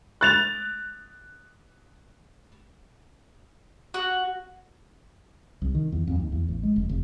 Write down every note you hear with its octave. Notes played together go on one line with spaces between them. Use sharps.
F#6 A6 F7
F#4
C2
D#3
E2
F2
D#2
E2
A1
G#3
F1
F1